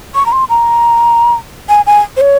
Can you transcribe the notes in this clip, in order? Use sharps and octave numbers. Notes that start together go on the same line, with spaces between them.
C#6
A#5
C6
A#5
G#5
G#5
C5
C#5